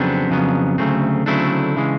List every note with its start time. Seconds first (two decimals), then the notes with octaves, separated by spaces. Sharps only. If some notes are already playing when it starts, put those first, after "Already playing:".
Already playing: F2 C#3 F#3 B3 C4 D4
0.30 F2 C#3 F#3 B3
0.78 D2 C#3 F#3 A3 C4
1.26 D2 C#3 F#3 A3 C4 D4 E4
1.77 C#3 E3 G#3